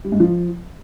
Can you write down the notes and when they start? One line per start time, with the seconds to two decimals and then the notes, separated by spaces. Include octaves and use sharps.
0.04 G3
0.12 G#2
0.20 F3